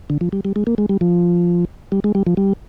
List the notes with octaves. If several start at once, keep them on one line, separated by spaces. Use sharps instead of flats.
D3
F3
G3
G3
G#3
A#3
G#3
G3
F3
G3
G#3
G3
F3
G3